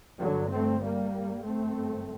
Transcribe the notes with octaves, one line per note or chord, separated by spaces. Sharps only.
G1 G2 D3 F#3
A3 C4
G3 A#3
G1 F#2 A3 C4